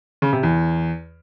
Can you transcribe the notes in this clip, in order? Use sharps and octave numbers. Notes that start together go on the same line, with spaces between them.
C#3
C3
E2